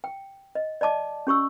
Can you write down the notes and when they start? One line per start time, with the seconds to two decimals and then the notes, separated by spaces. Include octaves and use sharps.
0.04 G5
0.55 D#5
0.81 D5 D#5 A5 D6
1.27 C#4 G4 C#6 E6